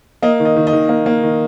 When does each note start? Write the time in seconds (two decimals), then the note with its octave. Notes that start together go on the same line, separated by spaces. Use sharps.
0.22 A#3 D#5
0.40 D#3
0.45 D#5
0.56 D#3
0.67 D#5
0.73 D#3
0.89 A#3
1.06 A#3
1.23 D#3